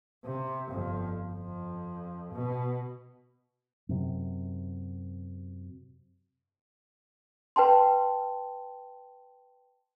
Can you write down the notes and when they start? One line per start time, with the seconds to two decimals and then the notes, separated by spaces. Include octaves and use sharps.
0.25 C3
0.70 G1 F2
1.33 F2
2.33 B2
3.89 F#2 C3
7.56 B4 G5 A5 C6